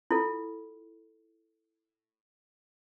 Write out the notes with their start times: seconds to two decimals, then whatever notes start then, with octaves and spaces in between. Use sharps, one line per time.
0.11 E4 F4 A4